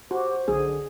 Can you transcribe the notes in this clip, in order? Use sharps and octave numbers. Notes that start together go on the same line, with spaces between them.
F#4 G4 C5
B1 D3 G#4